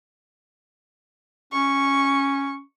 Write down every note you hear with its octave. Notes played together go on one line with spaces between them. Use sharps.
C#4 C#6